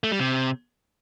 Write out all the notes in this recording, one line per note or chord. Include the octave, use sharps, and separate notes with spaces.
A3
G3
C3